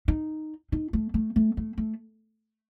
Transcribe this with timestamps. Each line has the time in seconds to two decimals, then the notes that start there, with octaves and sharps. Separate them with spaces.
0.08 D#4
0.72 D#4
0.93 A3
1.14 A3
1.36 A3
1.57 A3
1.78 A3